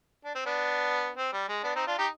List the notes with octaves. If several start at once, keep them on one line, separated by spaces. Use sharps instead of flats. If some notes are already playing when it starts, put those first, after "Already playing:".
D4
C4
B3 D4
C4
G3
G#3
B3 D4
C4 D#4
D4 F4
D#4 G4